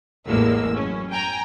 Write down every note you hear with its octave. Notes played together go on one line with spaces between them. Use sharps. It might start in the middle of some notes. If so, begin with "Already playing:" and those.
A1 E2 A2 G#3 A#3 E6
F#2 C#4
G5 G#5 A#5